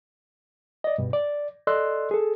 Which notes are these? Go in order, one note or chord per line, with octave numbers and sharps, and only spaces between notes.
D5 D#5
G2 B2
D5
A4 D5 D#5 C6 E6 F#6
G#4 A4